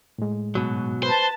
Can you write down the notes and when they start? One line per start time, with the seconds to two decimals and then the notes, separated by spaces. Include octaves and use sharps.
0.18 A2 G#3
0.55 G#2 B2 F#3
1.03 B4 C5 A5